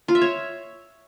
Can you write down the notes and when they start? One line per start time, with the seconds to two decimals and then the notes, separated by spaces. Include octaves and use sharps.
0.08 F4
0.15 E5
0.21 C#5